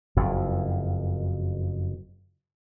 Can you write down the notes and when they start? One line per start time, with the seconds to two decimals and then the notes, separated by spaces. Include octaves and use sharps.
0.17 F#1 F2